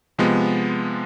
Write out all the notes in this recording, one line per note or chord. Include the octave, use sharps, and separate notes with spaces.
C3 F3 G#3 B3